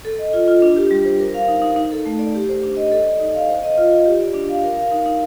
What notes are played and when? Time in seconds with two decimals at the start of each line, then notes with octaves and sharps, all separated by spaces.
0.05 A4
0.19 D#5
0.33 F4
0.48 F4
0.62 D4
0.76 G4
0.91 G3
1.05 C5
1.20 A#4
1.34 F5
1.48 D#4
1.62 D#4
1.76 D#4
1.92 A4
2.06 A3
2.19 D5
2.35 G4
2.49 C5
2.63 D4
2.76 D#5
2.92 A4
3.05 D5
3.21 D#4
3.35 F5
3.48 C5
3.63 D#5
3.78 F4
3.92 F4
4.06 G4
4.20 D5
4.34 D4
4.49 F5
4.64 A#4
4.77 F5
4.92 D#4
5.06 D#4